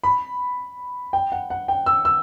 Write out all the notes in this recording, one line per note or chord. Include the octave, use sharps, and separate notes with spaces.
B5
G5
F#5
F#5
G5
E6
E6